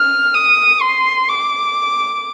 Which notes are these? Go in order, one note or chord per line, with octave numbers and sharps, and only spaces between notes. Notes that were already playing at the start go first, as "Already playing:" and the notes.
Already playing: F6
D#6
C6
D6